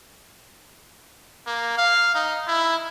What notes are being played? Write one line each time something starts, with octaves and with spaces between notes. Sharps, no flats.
A#3
F5
D#4
E4